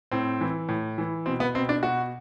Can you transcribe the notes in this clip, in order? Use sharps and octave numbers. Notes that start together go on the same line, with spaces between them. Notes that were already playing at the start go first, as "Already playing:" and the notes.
A2 C4
E3
A2
E3
B2 C4
B3
B2 C4
D4
B2 F#4